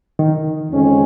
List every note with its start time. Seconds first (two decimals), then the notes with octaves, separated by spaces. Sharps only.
0.19 D#3
0.70 F2 C#3 G#3 C#4